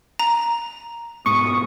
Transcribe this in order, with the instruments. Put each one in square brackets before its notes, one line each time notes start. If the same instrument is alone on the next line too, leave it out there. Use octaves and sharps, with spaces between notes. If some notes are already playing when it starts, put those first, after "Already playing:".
[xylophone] A#5
[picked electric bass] G#2 B2 [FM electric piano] C#6 [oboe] D#6